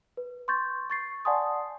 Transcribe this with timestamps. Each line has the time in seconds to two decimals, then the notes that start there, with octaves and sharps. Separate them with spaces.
0.17 B4
0.48 C6 C#6 G6 A6
0.90 C#6 A6 C7
1.25 D5 F#5 G#5 A5 C6 D#6